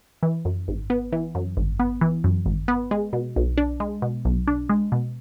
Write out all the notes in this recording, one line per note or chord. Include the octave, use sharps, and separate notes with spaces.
E3
F#2
G#1
B3
E3
F#2
G#1
B3
E3
F#2
G#1
B3
G#3
B2
B1
D4
G#3
B2
B1
D4
G#3
B2